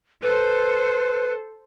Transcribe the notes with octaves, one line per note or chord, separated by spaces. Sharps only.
A4 B4 C5